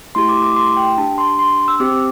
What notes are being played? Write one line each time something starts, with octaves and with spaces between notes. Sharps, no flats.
A3 E4 G4 C6
D6
D6
C6
G5
D4 G4 A5
C6
C6
E6
C4 G4 D6